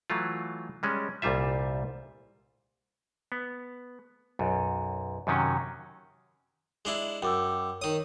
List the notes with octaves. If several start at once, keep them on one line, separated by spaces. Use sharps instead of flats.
E3 F#3 A3 F4
G3 G#3 C#4
C2 A#2 G3 F4 E5
B3
B1 F#2
F#2 C3 D#3 F#3 C#4
G#3 D4 E4
F#2 G5 D6 E6
D#3 C#5 D#6